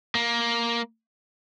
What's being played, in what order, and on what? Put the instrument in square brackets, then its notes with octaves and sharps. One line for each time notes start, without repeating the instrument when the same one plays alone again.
[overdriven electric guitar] A#3